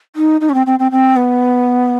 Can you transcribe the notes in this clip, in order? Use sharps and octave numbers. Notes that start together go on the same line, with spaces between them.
D#4
D#4
C#4
C4
C4
C4
C4
B3